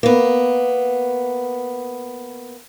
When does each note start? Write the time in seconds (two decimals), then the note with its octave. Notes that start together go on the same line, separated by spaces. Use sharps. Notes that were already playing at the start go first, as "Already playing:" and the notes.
0.03 A#3 B3